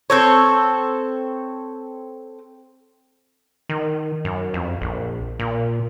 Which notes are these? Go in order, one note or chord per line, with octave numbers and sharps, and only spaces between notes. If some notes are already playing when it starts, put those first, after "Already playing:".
C4 A4 C#5
D#3
F#2
F2
A#1
A#2